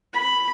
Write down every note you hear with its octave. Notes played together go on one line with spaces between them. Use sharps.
B5